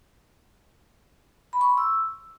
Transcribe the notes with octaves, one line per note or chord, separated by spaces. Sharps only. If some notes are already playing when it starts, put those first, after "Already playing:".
B5
C#6
C6
E6